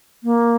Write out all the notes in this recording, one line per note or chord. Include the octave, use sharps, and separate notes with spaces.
A#3